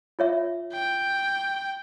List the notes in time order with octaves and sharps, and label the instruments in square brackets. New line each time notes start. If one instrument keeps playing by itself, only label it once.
[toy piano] F4 C#5 E5
[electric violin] G5